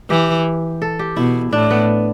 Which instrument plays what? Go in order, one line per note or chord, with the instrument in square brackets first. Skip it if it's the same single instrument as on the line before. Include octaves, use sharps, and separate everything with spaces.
[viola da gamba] E3 [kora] G4
[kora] A4
G4
[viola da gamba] B2 [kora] E4
[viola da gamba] A2 [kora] D4
[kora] B3